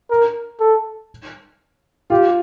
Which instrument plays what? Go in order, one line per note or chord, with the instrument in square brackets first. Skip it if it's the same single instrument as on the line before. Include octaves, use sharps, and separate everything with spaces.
[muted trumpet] A#4
A4
[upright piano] F4 [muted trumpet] G4